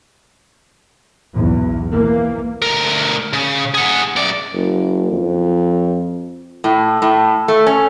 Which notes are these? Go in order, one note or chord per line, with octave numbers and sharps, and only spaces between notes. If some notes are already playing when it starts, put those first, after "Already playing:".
B1 E2
E3 A#3
D2 A#4
C#3
G#4 F#5
F#2 D5
F#1
F2
A2
A2
A3
C#4